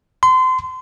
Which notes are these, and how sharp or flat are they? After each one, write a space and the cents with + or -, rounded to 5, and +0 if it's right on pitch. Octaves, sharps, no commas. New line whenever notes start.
C6 -30